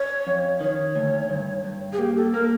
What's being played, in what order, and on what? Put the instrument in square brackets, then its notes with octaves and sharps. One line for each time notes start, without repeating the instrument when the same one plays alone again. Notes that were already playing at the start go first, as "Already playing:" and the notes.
Already playing: [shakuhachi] C#5
[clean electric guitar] F2
[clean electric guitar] D#3 [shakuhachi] C#5
[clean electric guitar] D2
G2
G2
[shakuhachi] G#4
[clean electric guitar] A#3 [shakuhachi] G4
[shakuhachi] A4
[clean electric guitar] A#3 [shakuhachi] A#4